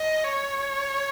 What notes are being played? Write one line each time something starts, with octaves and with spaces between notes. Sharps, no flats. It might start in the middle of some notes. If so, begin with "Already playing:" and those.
Already playing: D#5
C#5